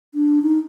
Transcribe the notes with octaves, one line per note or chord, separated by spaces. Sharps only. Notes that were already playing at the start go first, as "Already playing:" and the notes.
D4
D#4